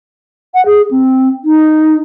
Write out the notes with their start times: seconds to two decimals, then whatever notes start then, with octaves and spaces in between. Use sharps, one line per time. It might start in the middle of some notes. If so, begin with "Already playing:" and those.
0.54 F#5
0.66 G#4
0.91 C4
1.44 D#4